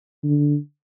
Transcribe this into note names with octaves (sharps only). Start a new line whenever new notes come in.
D3